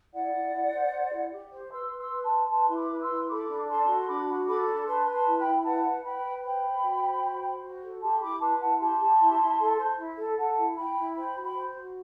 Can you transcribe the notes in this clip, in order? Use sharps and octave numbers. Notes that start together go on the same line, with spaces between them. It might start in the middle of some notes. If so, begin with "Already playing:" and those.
E4 D5 F#5
E4
E4
C5
C5
E4
G4
C5
B4 C6 E6
B4
C6 E6
B4
A5 C6
B4
B4 A5 C6
E4 C6
B5 D6
B4
D6
C6 E6
E4
A4 B5 D6
D4
A4 A5 C6
F#4
C6
D4 B5 D6
F#4
A4 B5 D6
D4
B4 A5 C6
B4
A5 C6
E4
G5 B5
E4
B4 F#5 A5
B4
B4 G5 B5
B4
C5 G5 B5
C5
F#4
C5
F#4
C5
F#4
A4
G4 A5 C6
E4 B5 D6
B4 A5 C6
E4 F#5 A5
G4 A5 C6
G4
E4
E4
A4
C5
E4
A4
A4 F#5 A5
E4
E4 G5 B5
E4
C5 G5 B5
F#4
G5 B5
C5
F#4